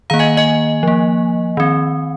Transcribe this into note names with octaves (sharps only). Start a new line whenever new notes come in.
D#3 A#3 F5 A#5
D#5 G#5
D#5 G#5
F3 A#3
D#3 C4